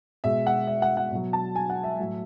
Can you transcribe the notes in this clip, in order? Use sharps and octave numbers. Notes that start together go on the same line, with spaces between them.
B2 G#3 E5
F#5
E5
F#5
F#5
B2 F#3
A5
G#5
F#5
E5
A2 F#3